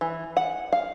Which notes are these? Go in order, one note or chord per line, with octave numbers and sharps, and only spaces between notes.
E3
F#5
F5